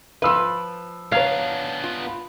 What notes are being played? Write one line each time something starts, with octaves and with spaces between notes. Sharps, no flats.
F3 B4 F5 E6 F6
B3 D4 C#5 F5 A#5 G#6
F4
B5